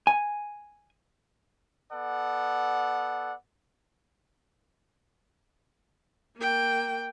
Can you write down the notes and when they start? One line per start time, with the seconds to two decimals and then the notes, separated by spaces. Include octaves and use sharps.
0.07 G#5
1.93 B3 A4 D5 F#5
6.37 A#3 G5